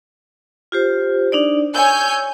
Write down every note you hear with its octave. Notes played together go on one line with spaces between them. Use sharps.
F4 G4 C5
D4 D#4 D5
C#5 G#5 E6 G6